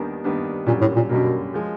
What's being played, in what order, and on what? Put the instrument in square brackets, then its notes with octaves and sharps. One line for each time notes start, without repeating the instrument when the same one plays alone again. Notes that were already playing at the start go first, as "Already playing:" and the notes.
Already playing: [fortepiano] D#2 D#3 G3 B3 D4
D#2 D#3 G3 B3 D4
[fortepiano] F#2 D3 G3 A#3 [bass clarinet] A#2
[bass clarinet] A2
A#2
[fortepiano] F#2 D3 G3 A#3 [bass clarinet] B2
[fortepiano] F3 G#3